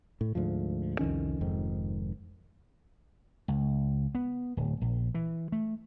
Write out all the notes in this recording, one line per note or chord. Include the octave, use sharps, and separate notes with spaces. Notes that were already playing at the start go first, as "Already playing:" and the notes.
A2
D2 G#2 F3
C2 F2 D#3 C#4
F1 F2 G#2 D#3
C#2
B3
D1
A#1
E3
A3